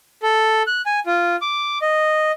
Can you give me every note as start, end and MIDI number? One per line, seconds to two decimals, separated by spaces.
0.22 0.63 69
0.67 0.81 90
0.86 1.00 80
1.06 1.36 65
1.42 1.78 86
1.82 2.32 75